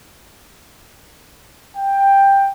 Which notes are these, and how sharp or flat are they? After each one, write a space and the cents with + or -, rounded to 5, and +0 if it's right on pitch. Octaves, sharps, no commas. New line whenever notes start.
G5 +10